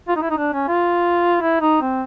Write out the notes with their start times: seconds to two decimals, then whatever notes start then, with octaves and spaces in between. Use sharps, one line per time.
0.08 F4
0.16 D#4
0.22 E4
0.30 D#4
0.38 D4
0.53 C#4
0.68 F4
1.41 E4
1.61 D#4
1.81 C4